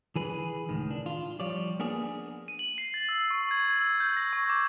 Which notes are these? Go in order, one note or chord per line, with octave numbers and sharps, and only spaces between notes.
E3 G#4 B4
C#2 A2 D#3
D4
F4
F3 G3 C#5 D5
A#3 B3 D4 G#4
D#7
F#7
C7
A6
E6
C#6
G#6
E6
G6
A#6
C#6
D6